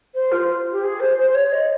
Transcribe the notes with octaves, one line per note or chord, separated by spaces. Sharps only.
C5
F4
G4
G#4
C5
C5
C5
C#5
D#5